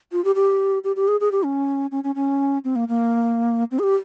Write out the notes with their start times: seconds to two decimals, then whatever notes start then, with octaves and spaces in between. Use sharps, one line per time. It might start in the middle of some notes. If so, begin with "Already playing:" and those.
0.12 F4
0.24 G4
0.35 G4
0.84 G4
0.96 G4
1.08 G#4
1.21 G#4
1.32 G4
1.43 C#4
1.91 C#4
2.04 C#4
2.15 C#4
2.64 C4
2.76 A#3
2.88 A#3
3.71 C4
3.79 G#4
3.83 G4